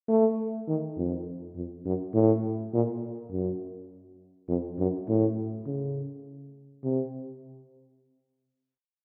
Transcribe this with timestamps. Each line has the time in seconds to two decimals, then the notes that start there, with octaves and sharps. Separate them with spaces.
0.08 A3
0.68 D#3
0.97 F2
1.56 F2
1.85 F#2
2.14 A2
2.73 A#2
3.32 F#2
4.49 F2
4.79 F#2
5.08 A2
5.66 C#3
6.84 C3